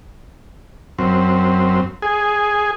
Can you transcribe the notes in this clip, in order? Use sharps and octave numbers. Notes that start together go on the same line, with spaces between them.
F#2 C4
G#4